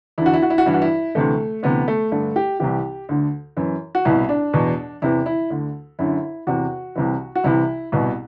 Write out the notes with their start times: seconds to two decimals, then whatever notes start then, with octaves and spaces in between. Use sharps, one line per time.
0.18 E2 D3 E4
0.26 F#4
0.34 E4
0.42 F#4
0.50 E4
0.58 F#4
0.66 G2 E3 E4
0.74 F#4
0.82 E4
1.15 D2 C3 E3 A3
1.63 D2 C3 E3 B3
1.88 A3
2.12 G2 D3 A3
2.36 G4
2.60 C2 C3 E3 G4
3.09 D2 D3
3.57 F#2 E3
3.95 F#4
4.05 C2 B2 E4
4.29 D4
4.54 E2 B2
5.02 E2 C3 E3 E4
5.26 E4
5.50 D2 D3
5.99 F#2 D3 E4
6.47 E2 C3 E3 F#4
6.95 C2 C3 E3
7.35 F#4
7.44 C2 C3 E3 E4
7.92 C2 B2